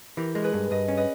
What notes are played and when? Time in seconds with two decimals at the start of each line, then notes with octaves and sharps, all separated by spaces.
0.17 E3 G4 A#4
0.35 G#3 A#4
0.44 G#4 B4
0.53 G2
0.71 G2 B4 D#5
0.88 C#4
0.97 B4 D#5